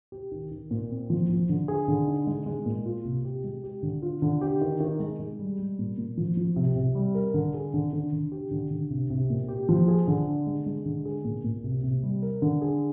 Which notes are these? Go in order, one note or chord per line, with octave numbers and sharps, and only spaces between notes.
G4
D#3
D#3
A#2
C4
F3
F3
D3
G#4
D3
D#4
G#3
G#3
A#2
F4
C3
G4
G#3
G4
D3
F4
D3
G4
D#3
D#3
G#3
G#3
G3
G3
A#2
A#2
F3
F3
C3
C3
G3
A#4
D3
G#4
D3
D3
D3
G4
D3
D3
C3
C3
A#2
G4
F3
G#4
D3
D4
G#3
G#3
D3
G#4
A#2
A#2
C3
C3
G3
A#4
D3
G#4